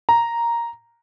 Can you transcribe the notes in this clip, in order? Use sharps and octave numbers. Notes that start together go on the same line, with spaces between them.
A#5